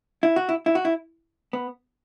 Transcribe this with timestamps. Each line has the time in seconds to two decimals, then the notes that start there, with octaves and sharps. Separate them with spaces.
0.23 E4
0.36 F#4
0.49 E4
0.66 E4
0.75 F#4
0.85 E4
1.53 B3